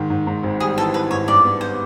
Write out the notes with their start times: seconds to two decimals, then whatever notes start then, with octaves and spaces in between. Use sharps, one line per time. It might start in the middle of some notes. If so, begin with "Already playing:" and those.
Already playing: G#2 D#3
0.10 G#2
0.27 G#2
0.43 G#1
0.60 G3 G#4
0.77 E3 A4
0.94 E3 B4
1.11 G#2 C#5
1.28 G2 D5
1.44 B3
1.61 B3 C5